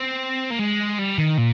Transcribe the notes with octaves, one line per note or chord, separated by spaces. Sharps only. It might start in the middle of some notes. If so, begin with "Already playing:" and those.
Already playing: C4
A#3
G#3
G3
D#3
A#2